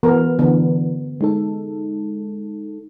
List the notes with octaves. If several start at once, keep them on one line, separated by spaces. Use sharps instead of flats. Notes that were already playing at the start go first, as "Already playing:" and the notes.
E3 B3 A#4
D3 E3 B3
G#3 D#4 A4